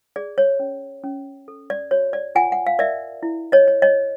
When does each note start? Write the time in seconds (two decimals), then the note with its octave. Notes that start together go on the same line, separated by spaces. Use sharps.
0.16 G#4 D5
0.38 C#5
0.60 C#4
1.04 C#4
1.48 A4
1.70 D5
1.91 F#4 C#5
2.13 D5
2.35 F4 F#5 G#5
2.52 F#5
2.67 F5
2.79 A#4 D5 E5
3.23 E4
3.52 C#5 D#5
3.68 C#5
3.82 C#5 D#5